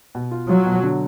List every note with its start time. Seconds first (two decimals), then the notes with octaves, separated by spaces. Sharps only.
0.15 B2
0.31 F4
0.49 F#3 F4
0.66 B2
0.83 D3